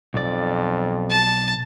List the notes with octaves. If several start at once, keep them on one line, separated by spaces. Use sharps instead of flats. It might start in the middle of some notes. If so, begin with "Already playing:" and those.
B1 F2 D5
A5